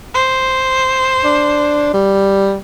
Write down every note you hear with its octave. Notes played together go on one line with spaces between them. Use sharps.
C5
D4
G3